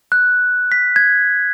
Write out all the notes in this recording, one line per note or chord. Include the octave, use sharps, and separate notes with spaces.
F#6
B6
G#6